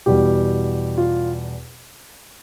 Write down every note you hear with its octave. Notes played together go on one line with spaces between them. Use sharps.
E2 B2 G3 G4
F4